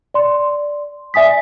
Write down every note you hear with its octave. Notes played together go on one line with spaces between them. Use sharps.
D5 C6
D5 E5 G#5 D#6 B6